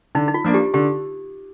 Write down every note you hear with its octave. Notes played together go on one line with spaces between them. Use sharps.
D3 D#4
D#4
F4
F3 A#3 D4
G4
D3 G4